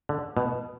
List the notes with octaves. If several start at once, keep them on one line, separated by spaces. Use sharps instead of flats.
D3
B2